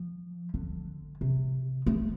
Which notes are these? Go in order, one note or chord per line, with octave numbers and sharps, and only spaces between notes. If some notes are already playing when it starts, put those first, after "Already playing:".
Already playing: F3
D3
C3
A3